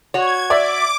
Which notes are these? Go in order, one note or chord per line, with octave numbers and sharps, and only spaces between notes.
F#4 C#5 G#6
D5 E5 D6